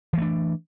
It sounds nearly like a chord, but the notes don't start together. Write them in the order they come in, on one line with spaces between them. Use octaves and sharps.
E3 A3 D4